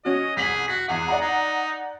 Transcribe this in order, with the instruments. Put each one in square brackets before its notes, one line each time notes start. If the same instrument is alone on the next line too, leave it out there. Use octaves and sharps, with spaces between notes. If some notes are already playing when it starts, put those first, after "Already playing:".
[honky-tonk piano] C#4 F#4 [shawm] D#5
[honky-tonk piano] C2 B6 F#7 [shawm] G#4
[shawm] F#4 [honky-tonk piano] B6
[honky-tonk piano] E2 F#5 [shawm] G#4
[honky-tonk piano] D5 F#5 A#5
[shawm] D#4